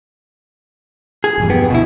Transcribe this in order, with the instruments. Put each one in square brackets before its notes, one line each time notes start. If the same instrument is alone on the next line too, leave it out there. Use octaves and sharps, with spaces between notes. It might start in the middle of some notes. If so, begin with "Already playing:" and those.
[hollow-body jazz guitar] G#4
[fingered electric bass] E1 G2 F3
[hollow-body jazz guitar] B3 G4
[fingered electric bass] D2 [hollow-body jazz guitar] B2 E4